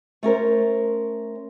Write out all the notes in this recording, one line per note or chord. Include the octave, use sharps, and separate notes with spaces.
A3 C#4 A#4 C5